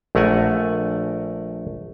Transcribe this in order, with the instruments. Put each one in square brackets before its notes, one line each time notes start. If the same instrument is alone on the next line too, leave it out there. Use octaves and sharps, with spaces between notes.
[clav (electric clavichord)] A#1 A3 A#4 F#5 G#5